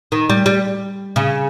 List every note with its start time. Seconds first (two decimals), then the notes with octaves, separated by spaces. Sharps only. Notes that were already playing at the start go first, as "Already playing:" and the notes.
0.12 D#3
0.30 G3
0.46 G3
1.16 C#3